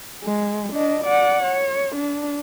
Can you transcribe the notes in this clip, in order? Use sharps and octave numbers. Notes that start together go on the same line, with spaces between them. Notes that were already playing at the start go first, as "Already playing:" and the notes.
G#3
D4 D#5
D5 F#5
C#5
D4